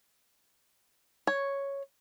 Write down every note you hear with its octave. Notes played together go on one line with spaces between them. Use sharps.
C#5